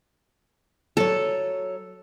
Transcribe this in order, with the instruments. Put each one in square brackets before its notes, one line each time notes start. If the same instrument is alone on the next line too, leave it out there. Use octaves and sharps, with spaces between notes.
[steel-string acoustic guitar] F#3 C#5 [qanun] A4